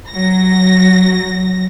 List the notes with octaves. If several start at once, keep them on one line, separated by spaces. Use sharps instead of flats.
F#3 A#6